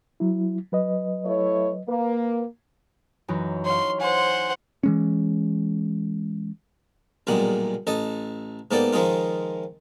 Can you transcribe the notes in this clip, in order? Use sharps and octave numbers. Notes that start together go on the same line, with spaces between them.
F#3 E4
F#3 B4 D#5
A3 E4 C#5
A#3 B4
F#2 E3 D#4
C#5 F5 C6
C5 F#5 G#5 C6
E3 G#3 C#4
B1 E2 A#2 G3 G#3 F#5
A1 A4 D#5
G#2 A#3 B3 A4 D5 G5
D#3 F3 G#3 D#4 F4